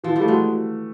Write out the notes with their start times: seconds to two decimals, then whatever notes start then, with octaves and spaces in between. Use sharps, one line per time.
0.04 E3 F3
0.16 F3 G3 A3
0.28 F#3 G#3